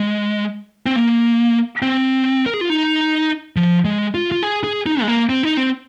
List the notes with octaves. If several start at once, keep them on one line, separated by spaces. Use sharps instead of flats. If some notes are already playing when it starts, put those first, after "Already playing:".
Already playing: G#3
C4
A#3
C4
A#4
G#4
F4
D#4
F3
G#3
F4
F4
G#4
G#4
D#4
G#3
A#3
C4
D#4
C4